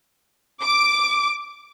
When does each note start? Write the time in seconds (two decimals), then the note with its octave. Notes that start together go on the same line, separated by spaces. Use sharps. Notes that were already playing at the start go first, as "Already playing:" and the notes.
0.61 D6